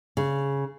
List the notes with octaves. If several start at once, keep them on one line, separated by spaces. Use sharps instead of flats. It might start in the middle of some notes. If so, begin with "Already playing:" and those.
C#3